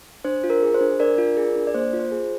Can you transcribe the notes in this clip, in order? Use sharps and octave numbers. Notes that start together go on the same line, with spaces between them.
D4 C5
F4
A#4
G#4
C5
D4
D4 A#4 D5
F4
G#4
D4
D5
A#3 C5
F4
C5
G#4